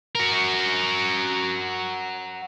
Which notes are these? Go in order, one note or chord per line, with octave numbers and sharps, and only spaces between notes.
F#4 A#4